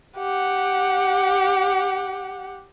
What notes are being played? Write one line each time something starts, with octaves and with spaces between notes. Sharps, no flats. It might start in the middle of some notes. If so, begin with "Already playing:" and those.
G4 F#5